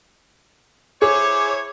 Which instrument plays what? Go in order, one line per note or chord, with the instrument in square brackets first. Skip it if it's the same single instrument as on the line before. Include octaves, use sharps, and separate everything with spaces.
[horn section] E4 C5 C#5 [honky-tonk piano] G#4 [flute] D6